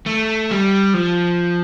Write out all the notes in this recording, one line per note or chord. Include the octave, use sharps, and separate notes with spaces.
A3
G3
F3